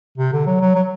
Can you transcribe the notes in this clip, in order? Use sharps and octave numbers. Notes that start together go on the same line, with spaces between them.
C3
D3
F#3
F#3
F#3